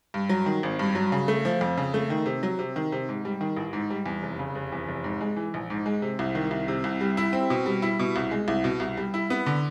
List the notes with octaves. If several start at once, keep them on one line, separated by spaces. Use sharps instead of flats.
G2
F#3
D#3
G#1
G2
F#3
C#3
A3
F3
F2
C#3
A3
D#3
C3
F#3
C3
D#3
C3
G#2
G3
D#3
A1
G#2
G3
E2
F1
C#3
F1
E2
F1
G#2
G#3
E3
A#1
G#2
G#3
C3
C2
D#3
C2
C3
C2
G3
E4
C4
B2
G3
E4
B2
C2
G#3
C2
B2
C2
G3
E4
B3
D3